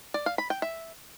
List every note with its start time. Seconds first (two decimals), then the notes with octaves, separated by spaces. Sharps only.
0.14 D5
0.26 F5
0.38 B5
0.50 G5
0.62 E5